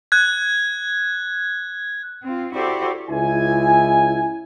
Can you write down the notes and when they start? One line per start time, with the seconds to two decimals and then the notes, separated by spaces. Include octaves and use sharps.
0.12 F#6 G#6
2.23 C4 F4
2.54 E4 F#4 G4 A4 C5 D5
3.10 C#2 E4 G#5